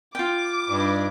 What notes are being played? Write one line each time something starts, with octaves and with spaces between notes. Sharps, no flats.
F4 G5 D6
G2 D4 D#4 B4